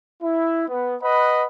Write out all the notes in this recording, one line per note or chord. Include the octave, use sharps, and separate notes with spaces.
E4
B3
B4 D#5 F#5 B5